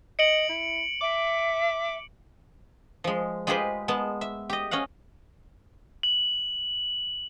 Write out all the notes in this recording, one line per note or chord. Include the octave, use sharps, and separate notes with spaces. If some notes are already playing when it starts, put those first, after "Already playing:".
D#5 C#7 D7 F#7
E4
E5 D6
F3 G#3
G#3 F4 G4 G#4 B4 C5
G#3 B3 A5
E5
G4 D#5
C#4 D#5 F5 F#5
F#7